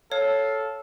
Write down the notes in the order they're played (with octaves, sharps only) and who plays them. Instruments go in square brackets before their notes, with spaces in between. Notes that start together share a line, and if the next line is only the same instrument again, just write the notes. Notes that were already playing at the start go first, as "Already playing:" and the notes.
[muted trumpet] A4 [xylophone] C#5 [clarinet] F5